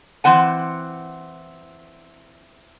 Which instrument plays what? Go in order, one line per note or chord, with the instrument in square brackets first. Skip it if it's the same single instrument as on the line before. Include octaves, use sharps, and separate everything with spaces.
[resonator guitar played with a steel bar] E3 C4 F#5 G#5